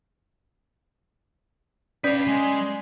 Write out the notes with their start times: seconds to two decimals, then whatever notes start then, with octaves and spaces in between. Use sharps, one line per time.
2.04 C#4 B4 D5 F5 B6
2.27 G#3